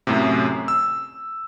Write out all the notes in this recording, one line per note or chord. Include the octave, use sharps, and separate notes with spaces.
F#2 A2 C3
E6